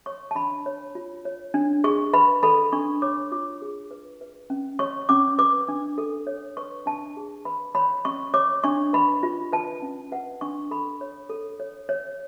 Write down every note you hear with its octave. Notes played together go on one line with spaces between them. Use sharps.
C#5 C#6
A5
D4 B5
C#5
F4
C#5
D4
G#4 C#6
B4 B5
A4 B5
D4 C#6
C#5 D6
F4 D6
G#4
B4
B4
C#4
C#5 C#6
C#4 D6
B4 D6
D4
A4
C#5
B4 C#6
D4 A5
G#4
B4 B5
C#5 B5
C#4 C#6
C#5 D6
D4 C#6
B4 B5
F4
B4 A5
C#4
B4 F#5
D4 C#6
A4 B5
C#5
A4
C#5
C#5